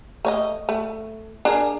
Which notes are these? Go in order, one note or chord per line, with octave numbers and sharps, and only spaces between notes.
A3 C#5 D#5
A3
D4 G#4 A#4